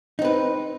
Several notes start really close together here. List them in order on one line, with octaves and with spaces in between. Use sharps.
D#4 C4 B4